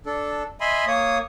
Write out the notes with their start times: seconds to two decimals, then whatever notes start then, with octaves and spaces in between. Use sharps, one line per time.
0.06 D4 A4
0.61 D#5 E5 G#5 B5 C6
0.87 A#3 C#5 D#6